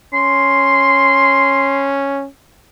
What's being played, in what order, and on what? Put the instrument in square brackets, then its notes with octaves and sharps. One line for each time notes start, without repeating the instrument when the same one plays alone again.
[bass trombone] C#4 [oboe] C6